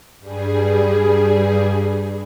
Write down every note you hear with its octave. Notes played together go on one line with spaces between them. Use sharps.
G2 G3 G#4